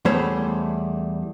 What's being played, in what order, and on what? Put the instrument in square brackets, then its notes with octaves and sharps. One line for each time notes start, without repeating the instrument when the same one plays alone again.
[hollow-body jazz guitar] E2 G3 A3 C5 C#5 B5